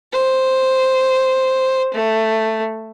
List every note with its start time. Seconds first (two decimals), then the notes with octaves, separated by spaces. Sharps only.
0.12 C5
1.94 A3